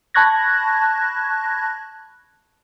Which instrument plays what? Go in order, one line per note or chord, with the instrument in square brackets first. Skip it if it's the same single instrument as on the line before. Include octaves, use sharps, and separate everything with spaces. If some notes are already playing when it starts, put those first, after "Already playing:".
[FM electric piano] A5 B5 C#6 F#6 G#6 A#6